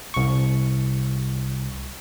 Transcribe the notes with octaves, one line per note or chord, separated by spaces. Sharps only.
C2 C#6